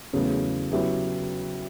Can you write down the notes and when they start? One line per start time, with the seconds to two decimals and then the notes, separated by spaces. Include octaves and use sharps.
0.13 E2 C#3 F#3 A3
0.72 C#3 F#3 B3 E4 G4